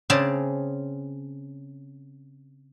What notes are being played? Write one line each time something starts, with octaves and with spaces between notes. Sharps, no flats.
C#3 C4 G#4 D5 A5